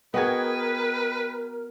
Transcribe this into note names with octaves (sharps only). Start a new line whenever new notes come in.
B3 F#4 G#4 A#4 B4 D#5 G5 G#6